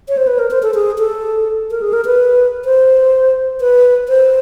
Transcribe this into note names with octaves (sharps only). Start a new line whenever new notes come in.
C#5
C5
B4
A#4
C5
A4
G#4
A4
A#4
G#4
A#4
B4
C5
B4
C5